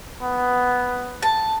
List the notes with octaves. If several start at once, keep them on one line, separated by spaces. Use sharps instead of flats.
B3
A5